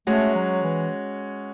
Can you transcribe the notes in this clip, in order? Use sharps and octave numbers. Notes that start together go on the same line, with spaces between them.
G#3 A3 C#4 F#4 C#5
F#3
E3